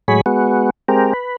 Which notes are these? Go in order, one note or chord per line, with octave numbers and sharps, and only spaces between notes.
A2 F#3 G#3 G#4 C#5 B5
G#3 B3 F#4
G#3 C4 G4 A#4
B4